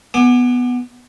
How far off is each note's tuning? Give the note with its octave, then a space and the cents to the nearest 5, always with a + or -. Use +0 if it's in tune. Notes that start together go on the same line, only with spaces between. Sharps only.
B3 +0 G#5 +0 D6 +30